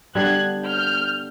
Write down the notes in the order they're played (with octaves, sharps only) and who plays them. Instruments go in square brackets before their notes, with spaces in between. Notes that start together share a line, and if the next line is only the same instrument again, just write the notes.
[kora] D3 G3 B3 [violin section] F#6 G#6
[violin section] F6 G6